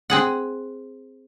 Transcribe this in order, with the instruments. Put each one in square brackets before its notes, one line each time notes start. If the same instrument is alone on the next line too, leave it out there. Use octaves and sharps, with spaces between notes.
[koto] C4 G#4 F#5